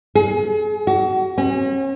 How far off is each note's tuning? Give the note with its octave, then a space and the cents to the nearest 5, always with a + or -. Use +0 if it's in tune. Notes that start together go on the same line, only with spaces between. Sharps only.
G#4 +40
F#4 +30
C#4 -40